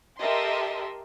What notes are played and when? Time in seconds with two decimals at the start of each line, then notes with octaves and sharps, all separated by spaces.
0.19 G4 A4 A#4 D#5 E5 C6